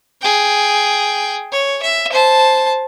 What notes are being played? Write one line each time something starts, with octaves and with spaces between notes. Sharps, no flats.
G#4 G5
C#5
E5
C5 A5